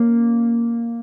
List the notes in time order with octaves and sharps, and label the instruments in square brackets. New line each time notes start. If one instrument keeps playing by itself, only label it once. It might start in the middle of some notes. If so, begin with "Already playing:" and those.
Already playing: [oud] A#3 C#4